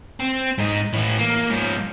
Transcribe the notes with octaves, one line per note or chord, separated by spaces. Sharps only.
C4
G#2 D#4
A2 E3
A#3
G#2 F3